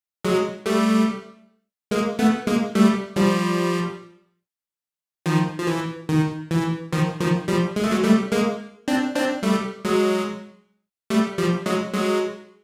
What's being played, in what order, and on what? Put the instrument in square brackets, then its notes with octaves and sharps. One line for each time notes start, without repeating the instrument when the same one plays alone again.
[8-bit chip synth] F#3 G#3
G3 A3
G#3 A#3
A3 B3
G#3 A#3
G3 A3
F3 G3
D#3 F3
F3
E3
D#3
E3
D#3 F3
D#3 F3
F3 G3
G#3
A3
F#3 G#3
G3 A3
G#3 A#3
C4 D4
C4 D4
G3 A3
F#3 G#3
G3 A3
F3 G3
F#3 G#3
F#3 G#3